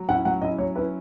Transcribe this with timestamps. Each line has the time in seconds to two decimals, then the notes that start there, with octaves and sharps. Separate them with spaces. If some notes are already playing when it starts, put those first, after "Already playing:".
Already playing: F#3
0.08 C#4 E4 F#5
0.25 F#3 F#5
0.42 C#4 E4 D#5
0.58 F#3 C#5
0.75 C#4 E4 B4